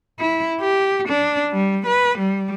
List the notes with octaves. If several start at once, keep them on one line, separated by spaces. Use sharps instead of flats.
E4
G4
D4
G3
B4
G3